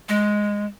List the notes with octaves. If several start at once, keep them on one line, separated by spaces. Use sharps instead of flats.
G#3